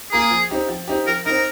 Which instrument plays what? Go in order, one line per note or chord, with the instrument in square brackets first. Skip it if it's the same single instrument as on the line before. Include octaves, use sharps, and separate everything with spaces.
[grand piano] A#3 F4 A#4 [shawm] G#4
[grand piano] F3
C4 D#4 G4
F3
C4 D#4 G4
[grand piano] F3 [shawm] A#4
[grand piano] C4 D#4 [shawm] A#4